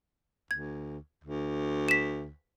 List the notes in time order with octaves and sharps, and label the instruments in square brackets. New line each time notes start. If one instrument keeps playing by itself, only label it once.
[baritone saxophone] D2 [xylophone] G#6
[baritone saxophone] D2
[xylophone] B6 E7